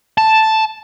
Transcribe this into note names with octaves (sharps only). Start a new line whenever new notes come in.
A5